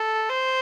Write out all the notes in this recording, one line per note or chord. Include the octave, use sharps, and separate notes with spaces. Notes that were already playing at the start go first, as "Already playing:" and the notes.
Already playing: A4
C5